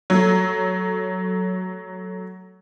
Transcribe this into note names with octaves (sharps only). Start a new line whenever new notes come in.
F#3 A3